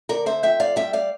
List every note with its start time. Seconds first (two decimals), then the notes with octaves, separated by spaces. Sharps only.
0.09 D3 A#4 D5
0.26 C5 E5
0.43 F2 E5 G5
0.60 D5 F5
0.76 G3 E5 G5
0.93 D5 F5